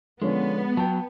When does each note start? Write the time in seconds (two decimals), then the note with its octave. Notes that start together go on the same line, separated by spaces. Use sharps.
0.22 D3 F3 G#3 B3 C#4
0.77 F#3 G5 A5